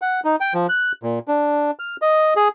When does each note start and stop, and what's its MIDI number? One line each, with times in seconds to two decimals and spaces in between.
0.02 0.20 78
0.25 0.36 63
0.40 0.54 79
0.54 0.67 53
0.69 0.92 90
1.03 1.19 46
1.28 1.71 62
1.79 1.96 89
2.02 2.34 75
2.36 2.48 68